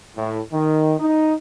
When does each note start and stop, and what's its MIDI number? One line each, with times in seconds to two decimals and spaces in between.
0.16 0.39 45
0.52 0.94 51
0.99 1.33 63